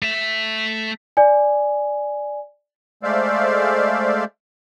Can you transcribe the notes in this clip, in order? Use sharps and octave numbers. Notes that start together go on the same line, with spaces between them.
A3 E5
D5 G#5
G#3 A3 C5 D5 E5 F5